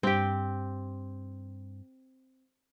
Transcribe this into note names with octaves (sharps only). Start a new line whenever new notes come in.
G2 C4 G4